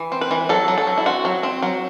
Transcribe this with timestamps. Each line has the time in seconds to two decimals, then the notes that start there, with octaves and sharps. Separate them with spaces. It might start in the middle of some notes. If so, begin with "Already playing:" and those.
Already playing: E3
0.12 C4
0.21 B4
0.31 E3
0.49 F#3 A4
0.68 F#3
0.78 A4
0.87 F#3
0.98 E4
1.06 C4 F#4
1.25 F#3
1.43 C4
1.63 F#3